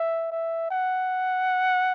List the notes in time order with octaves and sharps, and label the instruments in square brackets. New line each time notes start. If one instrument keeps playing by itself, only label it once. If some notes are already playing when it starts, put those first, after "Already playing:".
Already playing: [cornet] E5
E5
F#5